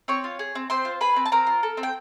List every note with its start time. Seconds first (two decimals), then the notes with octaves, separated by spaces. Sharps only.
0.08 C4 C#5 C#6
0.24 F4
0.39 G#4
0.55 C4
0.70 C4 C5 C6
0.85 F4
1.01 G#4 B4 B5
1.16 C4
1.26 A5
1.32 C4 A#4 A#5
1.47 F4
1.63 A4
1.77 C4
1.83 G5